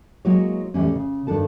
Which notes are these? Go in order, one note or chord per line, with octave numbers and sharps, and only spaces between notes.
F#3 G#3 A#3 E4 C#5
A2 E3 G3 A#3 C#4
C#3
G2 D#3 D4 A4 A5